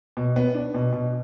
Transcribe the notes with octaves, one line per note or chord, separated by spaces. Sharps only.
B2
B3
D4
B2
B2